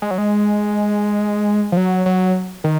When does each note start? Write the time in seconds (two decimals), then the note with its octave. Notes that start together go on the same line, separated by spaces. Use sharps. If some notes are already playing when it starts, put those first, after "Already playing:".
0.02 G#3
0.11 F#3
0.18 G#3
1.72 F3
1.77 F#3
2.06 F#3
2.64 D#3